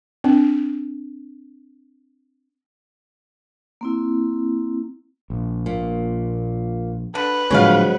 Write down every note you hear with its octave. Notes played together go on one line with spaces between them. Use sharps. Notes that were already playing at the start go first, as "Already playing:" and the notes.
C4 D4
A#3 C4 E4
A#1
A#2
D3 B4
A2 D3 F3 F#3 G#3 C4 C#5 F5